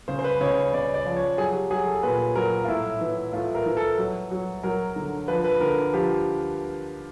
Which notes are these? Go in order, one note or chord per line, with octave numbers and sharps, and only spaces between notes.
C#3 C5
C5
B4
C#3 C#5
C#3 D5
D5
F3
C#5
F#3 G#4
G4
F#3 G#4
A4
A#2 B4
F#3 A#4
F4
A2 E4
E3
A2 F4
A#4
E3
A4
F#3
F#3
F#3 A#4
D3
F3 B4
B4
D3 A#4
F3 G4